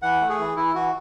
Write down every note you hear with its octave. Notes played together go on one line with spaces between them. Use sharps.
E3 F#5
A3
G#4
E3
E3 E4
E3 F#4